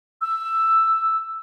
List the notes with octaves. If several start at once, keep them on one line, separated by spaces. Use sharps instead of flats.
E6